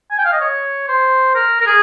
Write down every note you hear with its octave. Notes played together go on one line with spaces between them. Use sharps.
G#5
G5
F5
D#5
C#5
C5
A#4
A#4
G#4